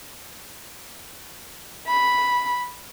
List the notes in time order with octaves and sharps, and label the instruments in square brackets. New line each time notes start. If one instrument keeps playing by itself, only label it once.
[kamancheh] B5